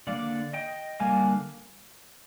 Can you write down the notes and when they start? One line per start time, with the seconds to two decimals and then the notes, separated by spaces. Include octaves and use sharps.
0.07 D3 G3 D5 F5
0.12 A#3
0.53 D#5 G5
1.00 D3 G3 A#3 F5 G#5